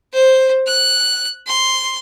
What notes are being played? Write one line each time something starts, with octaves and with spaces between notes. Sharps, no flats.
C5
F#6
C6